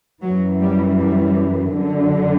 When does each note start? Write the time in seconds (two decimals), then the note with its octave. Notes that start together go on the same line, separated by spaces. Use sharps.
0.23 F#2 E3 F#3
0.61 G3
1.00 G3
1.76 F#2 D3